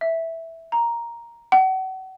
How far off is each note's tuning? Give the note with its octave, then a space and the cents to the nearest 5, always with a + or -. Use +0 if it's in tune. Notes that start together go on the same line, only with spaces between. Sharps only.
E5 -5
A#5 +5
F#5 +35